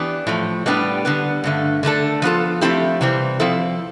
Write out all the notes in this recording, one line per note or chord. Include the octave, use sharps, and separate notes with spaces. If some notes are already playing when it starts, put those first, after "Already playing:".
Already playing: E3 B3 D4 G4
A2 F3 A3
A2 G3 B3 D4 G4
D3 G3 B3
G2 D3 A3
D3 A3 D4 A4
F3 B3 F4 A4
F3 A3 C4 E4 G4
C3 E3 G3 C4
F3 C4 E4 A4